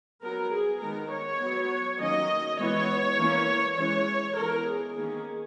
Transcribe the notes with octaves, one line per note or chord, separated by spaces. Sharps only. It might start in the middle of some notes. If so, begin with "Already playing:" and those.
F#3 B3 A#4
G#4
D#3 G#3 B3 A#4
C#5
F#3 B3
D#3 F#3 A#3 C#4 D#5
E3 G#3 B3 C#5
E3 A#3 C#4
E3 G#3 C#4 C#5
E3 G#3 B3 A#4
G#4
D#3 A#3 C#4 G#4